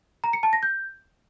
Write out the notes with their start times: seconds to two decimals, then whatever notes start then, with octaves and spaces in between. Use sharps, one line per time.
0.24 A#5
0.33 C#7
0.43 A5
0.53 A#6
0.63 G6